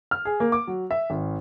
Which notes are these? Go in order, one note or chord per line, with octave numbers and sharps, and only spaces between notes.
F6
G#4
A#3
D6
F#3
E5
G#1